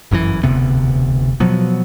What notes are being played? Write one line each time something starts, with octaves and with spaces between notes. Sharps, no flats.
G1 F#2 B2 E3
E1 D2 C3 B3
B2 F3 F#3 B3